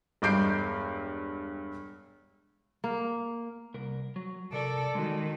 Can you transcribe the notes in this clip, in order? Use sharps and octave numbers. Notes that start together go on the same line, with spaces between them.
E1 G2 D6 G6 C7 D7
A#3
C2 A#4
F#3
C3 A4 A#4 D5
D#3 G#3 F#4